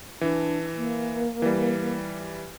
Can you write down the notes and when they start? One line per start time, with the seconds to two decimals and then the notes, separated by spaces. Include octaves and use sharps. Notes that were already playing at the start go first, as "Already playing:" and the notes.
0.21 E3 D4
0.77 A#3
1.42 E3 G3